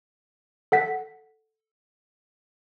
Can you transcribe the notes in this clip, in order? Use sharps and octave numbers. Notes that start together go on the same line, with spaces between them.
A4 F#5 B6